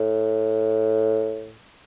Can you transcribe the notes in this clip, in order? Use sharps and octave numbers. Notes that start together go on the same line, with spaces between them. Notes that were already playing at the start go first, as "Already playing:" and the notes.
Already playing: A2